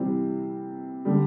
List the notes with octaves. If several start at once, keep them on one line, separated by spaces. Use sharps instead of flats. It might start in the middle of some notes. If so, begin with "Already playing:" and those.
Already playing: C3 E3 G3 C4
D3 G3